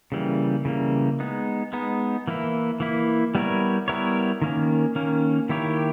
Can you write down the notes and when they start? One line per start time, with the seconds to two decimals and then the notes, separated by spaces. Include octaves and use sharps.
0.12 C#3 E3 G3 A#3
0.65 C#3 E3 G3 A#3
1.20 G#3 B3 D#4
1.73 G#3 B3 D#4
2.27 E3 A#3 E4
2.80 E3 A#3 E4
3.35 G3 B3 E4 A#4 C#5
3.88 G3 B3 E4 A#4 C#5
4.42 D#3 A#3 C#4
4.95 D#3 A#3 C#4
5.49 D#3 A#3 E4 G4 C#5